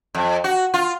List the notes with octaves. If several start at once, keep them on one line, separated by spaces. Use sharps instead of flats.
F2
F#4
F4